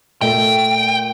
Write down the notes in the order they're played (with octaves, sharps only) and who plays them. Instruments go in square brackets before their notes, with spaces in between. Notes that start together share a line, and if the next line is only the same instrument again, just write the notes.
[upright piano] A#2 A3 [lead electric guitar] G5